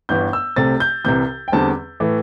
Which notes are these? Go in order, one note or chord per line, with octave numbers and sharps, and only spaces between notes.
G1 G2 E3 G6
E6
C2 C3 A3 C4 A6
G6
C2 C3 E3 G6
G5
E2 D3 G3 C4 A5
A2 E3 A3